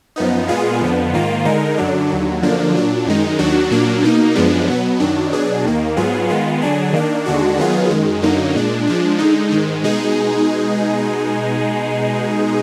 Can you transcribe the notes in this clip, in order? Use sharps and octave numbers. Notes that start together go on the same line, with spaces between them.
F#2 F3 B3 D#4
A#2 G#3 B3 F4 G#4
F2 D3 F3 B3
G#2 D#3 A#3 F4
D3 G#3 D#4 A#4
F#2 D3 F#3 D4
D#2 D3 F#3
F#2 D3 F3 A#3 D4
A#2 F#3 D4
F#2 D#3 G#3 D#4
D#2 D#3 F#3 D4 F#4
A#2 F#3 A#3 D4
B2 A#3 D#4
F#2 F3 G#3 B3 D4
B2 F#3 B3
F#2 D#3 F#3 D4
B2 F#3 D4 G#4
D#2 D#3 A#3
G#2 F#3 B3 F4 G#4
D#3 G#3 B3 F4
D3 F#3 D4 G#4
D#3 A#3 D4
D#2 D3 G#3 D4 F#4
D#3 F#3 B3 F4 G#4
F#2 D#3 G#3
F#2 D3 F#3 A#3 D#4
A#2 G#3 D4
F3 G#3 D4
D3 G#3 D#4
G#2 D#3 G#3
B2 G#3 D#4 G#4